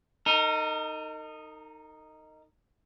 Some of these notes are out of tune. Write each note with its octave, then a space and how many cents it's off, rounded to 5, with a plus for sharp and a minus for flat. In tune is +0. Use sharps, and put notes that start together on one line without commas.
D#4 +0 A#4 -40